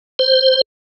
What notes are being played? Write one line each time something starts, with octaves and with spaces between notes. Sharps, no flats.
C5